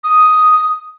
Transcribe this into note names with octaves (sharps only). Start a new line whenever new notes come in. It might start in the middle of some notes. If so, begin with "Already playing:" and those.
D#6